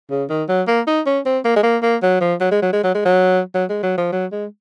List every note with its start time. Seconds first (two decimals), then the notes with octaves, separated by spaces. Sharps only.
0.11 C#3
0.30 D#3
0.49 F#3
0.68 A#3
0.88 D#4
1.07 C#4
1.26 C4
1.45 A#3
1.56 G#3
1.64 A#3
1.83 A#3
2.03 F#3
2.21 F3
2.41 F#3
2.52 G#3
2.62 F#3
2.73 G#3
2.84 F#3
2.95 G#3
3.06 F#3
3.55 F#3
3.70 G#3
3.83 F#3
3.98 F3
4.13 F#3
4.32 G#3